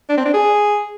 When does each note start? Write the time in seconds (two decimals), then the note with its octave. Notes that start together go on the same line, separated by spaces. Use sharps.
0.09 D4
0.17 C4
0.25 D4
0.34 G#4